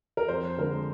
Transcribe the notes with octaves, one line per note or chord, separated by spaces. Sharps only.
A#4
F2 C5
D3 G#3 A#4